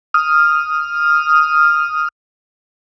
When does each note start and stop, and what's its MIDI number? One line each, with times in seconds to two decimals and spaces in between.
0.14 2.08 87
0.14 2.08 89